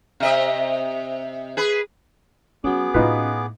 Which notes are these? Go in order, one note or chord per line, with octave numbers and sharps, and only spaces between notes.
C3 D#5 E5
G#4 B4
F#3 B3 C#4 F#4 G#4 D6
A2 A3 D#4 F4 B4